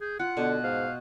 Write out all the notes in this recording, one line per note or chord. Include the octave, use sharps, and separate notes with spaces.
G#4 G6
F4 F#5 F#6
B2 D3
G#2 F5